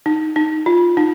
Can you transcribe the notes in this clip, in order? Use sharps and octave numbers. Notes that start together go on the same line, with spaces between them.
D#4
D#4
F4
D#4